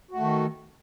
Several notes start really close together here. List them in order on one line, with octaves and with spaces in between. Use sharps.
F#4 A3 D#3